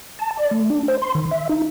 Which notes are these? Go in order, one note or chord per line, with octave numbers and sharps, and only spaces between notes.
A5
D5
A3
D4
C5
C6
D#3
E5
D#4